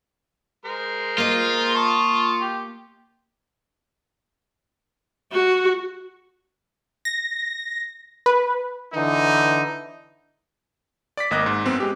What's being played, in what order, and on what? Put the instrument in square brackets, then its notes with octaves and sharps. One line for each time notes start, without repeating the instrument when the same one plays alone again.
[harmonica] G#3 A#4 C5
[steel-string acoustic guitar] A#3 D#5 [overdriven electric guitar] F4
[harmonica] A5 C#6 D#6
G4
[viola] F#4
[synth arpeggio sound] A#6
B4
[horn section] D3 E3 D#4
[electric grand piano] D5 D6 B6
G#1 A#3 D#5 D6 F#6
G#2
F#2 B3 C4
G#3 G4